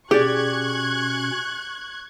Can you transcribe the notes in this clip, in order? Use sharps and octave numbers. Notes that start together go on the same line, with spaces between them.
B2 C#4 G4 G#4 D5 C#6 F#6 G#6